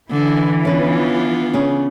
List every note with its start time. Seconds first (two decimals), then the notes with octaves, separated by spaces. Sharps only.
0.11 D3 E3
0.65 B3 C#4 D4 F4 B4
1.53 C#3 C#4 G#4